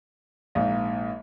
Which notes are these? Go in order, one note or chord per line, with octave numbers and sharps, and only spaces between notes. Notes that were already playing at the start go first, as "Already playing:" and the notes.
A#1 G#2 F5